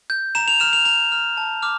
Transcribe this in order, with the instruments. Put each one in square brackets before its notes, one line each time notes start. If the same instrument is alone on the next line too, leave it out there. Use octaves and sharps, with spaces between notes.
[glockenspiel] G6
A#5 E7
F7
F6 E7
F7
A#5 F7
F6
A5
D6 F6